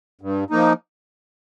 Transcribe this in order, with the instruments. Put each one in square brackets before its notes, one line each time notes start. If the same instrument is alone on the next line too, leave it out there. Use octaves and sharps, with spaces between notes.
[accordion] G2
F3 A#3 D#4